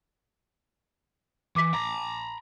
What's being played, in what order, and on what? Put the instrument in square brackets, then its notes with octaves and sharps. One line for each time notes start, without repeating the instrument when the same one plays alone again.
[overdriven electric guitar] E3 [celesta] D6 B6
[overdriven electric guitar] A#5 B5